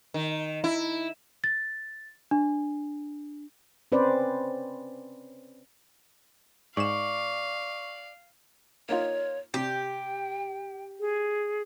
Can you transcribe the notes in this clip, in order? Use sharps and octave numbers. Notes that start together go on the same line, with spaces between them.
D#3
E4
A6
D4
C4 C#4 B4 C5 D5
G#2 D5 F5 C#6 E7
A#3 D#4 F4 C#5
C3 G4 G5
G#4